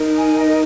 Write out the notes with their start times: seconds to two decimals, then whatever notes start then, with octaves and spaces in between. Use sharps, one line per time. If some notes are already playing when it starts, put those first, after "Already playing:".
Already playing: D#4 A#4
0.15 G#5
0.37 D#5